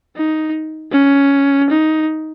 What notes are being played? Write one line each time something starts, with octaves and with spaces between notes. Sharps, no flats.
D#4
C#4
D#4